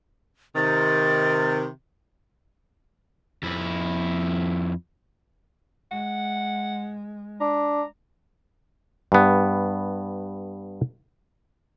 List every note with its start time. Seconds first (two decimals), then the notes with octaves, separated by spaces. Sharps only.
0.56 C3 D#3 A6
3.43 F2 E4
5.91 G#3 F#5
7.40 D4 A#5
9.12 G2 B3